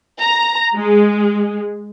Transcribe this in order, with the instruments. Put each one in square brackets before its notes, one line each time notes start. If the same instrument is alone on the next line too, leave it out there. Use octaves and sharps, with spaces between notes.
[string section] A#5
G#3